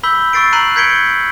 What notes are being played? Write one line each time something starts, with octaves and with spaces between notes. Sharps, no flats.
B5 E6 G6 B6 G7
C#6 E6 A6 C7 D7
A#5 F#6 C7 D#7 F#7
G6 G#6 B6 C#7 D7 G7